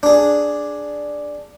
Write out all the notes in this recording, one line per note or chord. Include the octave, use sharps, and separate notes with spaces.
D4 G#4